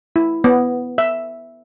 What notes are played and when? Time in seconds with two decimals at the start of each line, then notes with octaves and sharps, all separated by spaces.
0.16 E4
0.44 B3
0.98 E5